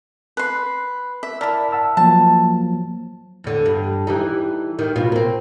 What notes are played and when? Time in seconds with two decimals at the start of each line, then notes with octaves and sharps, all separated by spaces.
0.37 B4 C6
1.23 E5
1.41 E4 A#4 D5 A5 B6
1.72 F#5 A5 E6
1.97 F3 F#3 A#3 A5
3.44 E2 D3
3.66 G2
4.07 E3 G3 D#4
4.79 D#3
4.96 B2 F4
5.12 A#3 C4